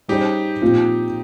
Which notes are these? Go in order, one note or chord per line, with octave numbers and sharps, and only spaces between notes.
G3 C#4 D#4 G4 G#4 C5
A#2 F3 C4 F4